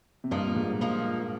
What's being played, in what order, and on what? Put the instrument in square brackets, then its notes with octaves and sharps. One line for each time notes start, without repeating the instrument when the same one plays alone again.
[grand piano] C3
[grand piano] G2 A#2 [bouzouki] F3 A#3 D#4
[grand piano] A#2
G#2
[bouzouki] F3 A#3 D#4